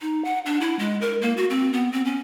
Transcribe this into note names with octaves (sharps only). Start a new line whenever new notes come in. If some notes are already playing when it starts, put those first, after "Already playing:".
D#4
F#5
D4
E4
G#3
A#4
A#3
F#4
C4
B3
C4
C#4